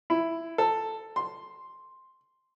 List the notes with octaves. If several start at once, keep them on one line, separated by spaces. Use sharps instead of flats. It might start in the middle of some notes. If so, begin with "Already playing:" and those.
E4
A4
C6